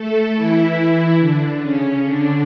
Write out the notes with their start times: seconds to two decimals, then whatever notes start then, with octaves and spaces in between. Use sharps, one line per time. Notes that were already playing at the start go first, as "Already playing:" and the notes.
Already playing: A3 A4
0.36 E3 E4
1.20 D3 D4
1.62 C#3 C#4
2.04 D3 D4